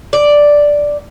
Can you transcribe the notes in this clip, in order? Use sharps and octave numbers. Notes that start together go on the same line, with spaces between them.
D5